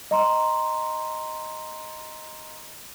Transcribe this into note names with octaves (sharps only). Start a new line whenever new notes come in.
D#5 A#5 C6